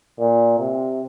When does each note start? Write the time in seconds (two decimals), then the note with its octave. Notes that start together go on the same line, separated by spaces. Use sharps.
0.20 A#2
0.60 C3